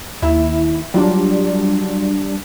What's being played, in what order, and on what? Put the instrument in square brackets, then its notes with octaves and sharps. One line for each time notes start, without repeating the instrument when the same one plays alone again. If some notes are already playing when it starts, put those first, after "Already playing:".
[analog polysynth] D#2 E4 [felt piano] E5
[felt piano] F#3 F4 [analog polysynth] G3 D4